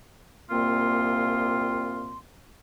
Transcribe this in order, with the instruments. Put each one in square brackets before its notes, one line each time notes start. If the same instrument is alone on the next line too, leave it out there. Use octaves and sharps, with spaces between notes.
[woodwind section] C2 A#2 A#3 C4 F4 C6